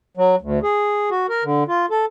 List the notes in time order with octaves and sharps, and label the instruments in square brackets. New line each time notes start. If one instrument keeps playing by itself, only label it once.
[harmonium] F#3
D2
G#4
F#4
A#4
D3
F4
A4